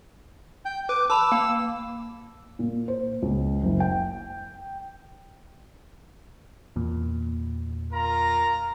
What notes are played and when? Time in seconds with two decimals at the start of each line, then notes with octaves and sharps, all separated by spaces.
0.65 G5
0.89 B4 D6
1.10 A5 B5 D6 E6
1.32 A#3 G5
2.59 A#2
2.88 C5
3.22 C#2
3.63 F#1
3.80 G5
6.76 E2 A#2
7.93 F4 A#4 A#5